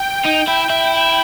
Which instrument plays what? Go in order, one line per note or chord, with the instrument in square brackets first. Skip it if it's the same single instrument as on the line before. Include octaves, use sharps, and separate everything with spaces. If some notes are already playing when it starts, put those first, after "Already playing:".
Already playing: [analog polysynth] G5
[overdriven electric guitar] D#4
E4
E4